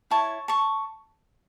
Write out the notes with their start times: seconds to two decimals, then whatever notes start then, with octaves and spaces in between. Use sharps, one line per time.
0.11 E4 C#5 A5 C#6
0.48 A5 C#6